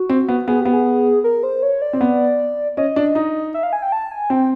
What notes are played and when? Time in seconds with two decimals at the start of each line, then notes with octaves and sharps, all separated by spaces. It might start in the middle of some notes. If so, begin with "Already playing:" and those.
Already playing: F#4
0.09 C4
0.28 B3
0.48 B3 G#4
0.60 B3 G4
0.73 G#4
1.24 A#4
1.43 C5
1.63 C#5
1.82 D5
1.93 C4
2.01 B3
2.77 C#4 D#5
2.96 D4
3.15 D#4
3.54 E5
3.63 F5
3.73 G#5
3.82 G5
3.92 A5
4.11 G#5
4.30 C4 G5